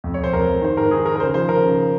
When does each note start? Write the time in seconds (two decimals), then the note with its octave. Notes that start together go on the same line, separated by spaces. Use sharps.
0.04 F2
0.14 C#5
0.18 F2
0.24 C5
0.33 F2 A#4
0.48 F2
0.61 D#3 C5
0.77 G#2 A#4
0.91 D#3 G#4
1.05 D#3 A#4
1.15 A#4
1.20 C#3 C5
1.34 F3 C5
1.49 C#3 A#4
1.63 C#3